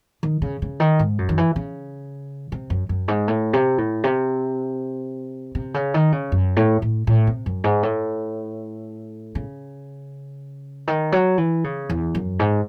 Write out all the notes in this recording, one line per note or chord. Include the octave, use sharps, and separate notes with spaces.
D#3
C#3
C#3
D#3
G#2
F#2
D#3
E3
C#3
C3
F#2
F#2
G#2
A2
C3
A2
C3
C3
C#3
D#3
C#3
F#2
A2
A2
A2
C3
F#2
G#2
A2
C#3
D#3
F#3
E3
C#3
E2
F#2
G#2